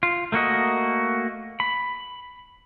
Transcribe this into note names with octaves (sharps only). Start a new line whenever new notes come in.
F4
A3 A#3 F#4 D#5
B5